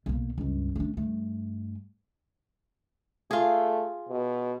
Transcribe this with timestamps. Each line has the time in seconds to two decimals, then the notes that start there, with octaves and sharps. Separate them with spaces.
0.06 B1 A#3
0.38 C#2 G2
0.76 A3 D4
0.97 G2 A3
3.31 A3 F4 G#4
4.09 B2